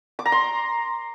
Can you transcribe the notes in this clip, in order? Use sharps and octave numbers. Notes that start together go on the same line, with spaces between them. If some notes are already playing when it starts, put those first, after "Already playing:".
D6
A#5
C6